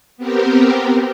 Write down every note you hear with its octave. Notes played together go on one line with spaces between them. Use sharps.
B3 C4 G4 A#4